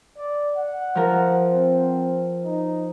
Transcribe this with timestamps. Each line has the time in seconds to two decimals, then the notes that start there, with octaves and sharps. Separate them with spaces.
0.17 D5
0.56 F#5
0.95 F3 A#4
1.51 C4
2.44 D#4